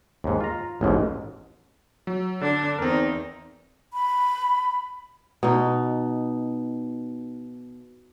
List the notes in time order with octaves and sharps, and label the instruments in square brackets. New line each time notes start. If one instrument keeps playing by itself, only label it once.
[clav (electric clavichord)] D#2 G#2
F4 A#5
A1 D#2 G#2 B2
[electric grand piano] F#3
[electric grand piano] D3 [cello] D4
[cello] E2 D#4 [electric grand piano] C4 A#4
[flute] B5
[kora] B2 D#4